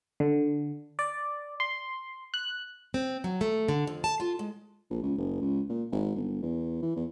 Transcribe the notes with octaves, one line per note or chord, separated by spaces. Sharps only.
D3
D5
C6
F#6
C4
F#3
A3
D3
F2
A5
F4
G#3
A#1
C#2
F#1
C#2
A#2
G#1
G1
E2
E3
E2